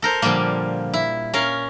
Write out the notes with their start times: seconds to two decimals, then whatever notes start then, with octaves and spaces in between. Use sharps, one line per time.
0.02 A4 A#4 C5
0.22 A#2 D3 F3 G3 A#3
0.94 E4
1.34 C#4 A#4 F5